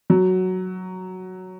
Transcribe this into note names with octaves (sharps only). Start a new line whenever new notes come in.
F#3